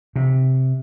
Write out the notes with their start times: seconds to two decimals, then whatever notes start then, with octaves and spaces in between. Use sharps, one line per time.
0.16 C3